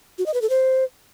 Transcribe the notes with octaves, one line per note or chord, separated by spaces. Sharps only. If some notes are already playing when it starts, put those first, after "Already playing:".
F#4
D#5
B4
A4
C5